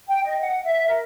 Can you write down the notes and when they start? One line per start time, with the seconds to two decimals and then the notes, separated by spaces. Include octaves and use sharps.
0.08 G5
0.24 D#5
0.41 F#5
0.65 E5
0.88 A#4